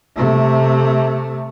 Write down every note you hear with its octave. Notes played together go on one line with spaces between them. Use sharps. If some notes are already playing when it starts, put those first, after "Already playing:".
C3 A3